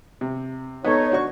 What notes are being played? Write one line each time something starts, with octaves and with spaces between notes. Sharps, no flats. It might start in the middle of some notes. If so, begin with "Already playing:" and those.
C3
B3 D#4 A4 C#5
D4 F#4 C#6